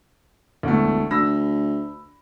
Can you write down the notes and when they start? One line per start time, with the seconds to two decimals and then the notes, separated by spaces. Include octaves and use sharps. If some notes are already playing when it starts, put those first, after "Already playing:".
0.63 E1 D2 A3
1.11 D2 B5 E6 A#6